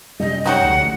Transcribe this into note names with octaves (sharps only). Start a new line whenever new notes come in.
F#2 C3 G3 D#5
D#4 G4 C#5 F#5
D2 D3 F#3
A1